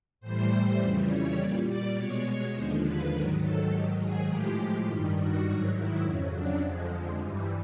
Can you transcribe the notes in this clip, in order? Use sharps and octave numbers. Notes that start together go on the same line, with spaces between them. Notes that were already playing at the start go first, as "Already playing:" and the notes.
A2 E3 G3 C5
F2 C#3 E3 G3
C#5
A#2 G3 D5
D5
B2 G#3 C#5
D#2 D3 F3 G#3 C5
B4
G#2 D#3 F#3 A#4
A4
G#2 D#3 F#3 G4
G#4
A2 F3 G#3 G4
G2 D#3 G3
F#4
G#2 D#3 F#3 F#4
E4
F2 C#3 F#3
D4
F2 D3 F3 G#3
G2 E3 G3